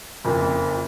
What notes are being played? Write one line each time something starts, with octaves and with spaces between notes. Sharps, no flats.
F#1 F2